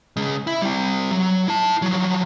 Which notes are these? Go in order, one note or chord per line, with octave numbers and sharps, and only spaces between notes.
C#3 G#3
E4
G3 C4
F#3
E4 A5
F3 F#3